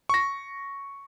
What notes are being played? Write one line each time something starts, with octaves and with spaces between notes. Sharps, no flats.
C#6 A#6